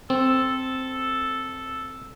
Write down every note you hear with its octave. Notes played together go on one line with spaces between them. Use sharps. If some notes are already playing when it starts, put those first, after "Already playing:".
C4 A4